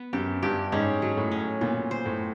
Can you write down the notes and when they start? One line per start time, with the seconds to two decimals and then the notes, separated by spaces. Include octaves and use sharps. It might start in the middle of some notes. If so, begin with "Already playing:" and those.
Already playing: B3
0.13 F#2 G4
0.42 G2 G4
0.72 G#2 C#4
1.02 F#3
1.17 A2
1.31 C#4
1.61 A#2 B3
1.91 C5
2.06 A2